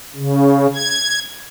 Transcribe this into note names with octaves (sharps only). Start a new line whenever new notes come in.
C#3
G#6